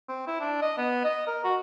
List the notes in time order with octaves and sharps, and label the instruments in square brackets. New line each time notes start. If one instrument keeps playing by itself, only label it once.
[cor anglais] C4
E4
D4
D#5
B3
D#5
A#4
F#4